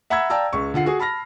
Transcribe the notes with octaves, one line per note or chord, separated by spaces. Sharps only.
E5 F#5 A#5 B5 E6 G#6
D5 F5 G5 A5 A#5 E6
C#2 C#6
D3 F4 F#5 C7
F#4 G#4
A5 B5 F6 A#6